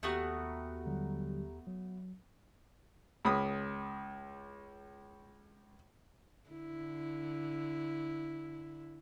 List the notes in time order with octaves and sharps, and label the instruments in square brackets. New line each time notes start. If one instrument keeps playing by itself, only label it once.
[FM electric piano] D#2 G4 A#5 [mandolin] A3 B3 F#4
[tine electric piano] D3 F#3 G3
F#3
[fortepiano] C#2 B5 D#6
[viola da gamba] D3 E4